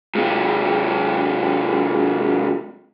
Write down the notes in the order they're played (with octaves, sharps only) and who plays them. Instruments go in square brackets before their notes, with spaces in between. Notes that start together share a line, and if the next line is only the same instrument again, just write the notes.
[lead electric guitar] G#2 C3